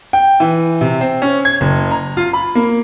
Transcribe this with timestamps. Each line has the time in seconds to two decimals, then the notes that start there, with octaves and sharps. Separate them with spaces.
0.13 G5
0.40 E3
0.81 C3
1.01 C4
1.22 C#4
1.45 G#6
1.61 F#1
1.91 A#5
2.17 F4
2.33 B5
2.55 A#3